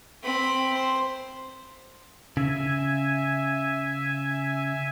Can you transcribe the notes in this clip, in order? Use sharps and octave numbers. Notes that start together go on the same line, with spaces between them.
C4 B5
C5
C#3 E5 G#5